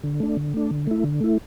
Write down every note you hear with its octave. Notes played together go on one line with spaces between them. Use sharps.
D3
A3 D4
D3
A3 D4
D3
A3 E4
D3
A3 E4